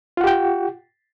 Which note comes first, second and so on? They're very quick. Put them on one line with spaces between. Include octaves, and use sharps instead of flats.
F4 F#5 G4 G5